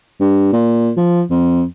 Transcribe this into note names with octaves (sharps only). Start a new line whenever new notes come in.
G2
A#2
F3
F2